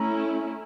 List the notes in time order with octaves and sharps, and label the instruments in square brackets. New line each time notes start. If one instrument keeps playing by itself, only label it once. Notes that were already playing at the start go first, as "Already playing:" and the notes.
Already playing: [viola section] A3 C#4 E4 [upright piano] A#5